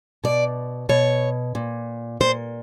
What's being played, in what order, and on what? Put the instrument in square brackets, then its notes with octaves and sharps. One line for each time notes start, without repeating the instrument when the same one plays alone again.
[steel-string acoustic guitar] B2 D5
B2 C#5
A#2
A#2 C5